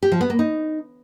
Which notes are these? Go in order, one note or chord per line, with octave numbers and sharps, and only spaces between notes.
G4
F3
B3
A#3
D#4